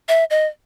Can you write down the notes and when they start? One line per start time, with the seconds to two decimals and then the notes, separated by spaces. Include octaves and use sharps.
0.09 E5
0.30 D#5